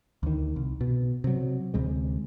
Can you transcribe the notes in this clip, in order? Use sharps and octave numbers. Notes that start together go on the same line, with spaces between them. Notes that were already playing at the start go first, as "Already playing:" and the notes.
D2 D#3
C2
B2
C3 F#3
D2 C3 G#3